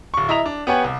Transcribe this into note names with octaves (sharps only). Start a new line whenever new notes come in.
D1 C#6
E4 D#5 E5 A#5 F7
D4
B3 G4 C#5 F#5 G#5
C2